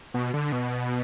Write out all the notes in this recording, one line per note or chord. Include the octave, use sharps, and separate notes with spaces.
B2
D3
B2